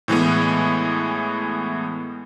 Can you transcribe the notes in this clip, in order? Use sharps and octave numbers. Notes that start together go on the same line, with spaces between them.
A2 E3 G#3 B3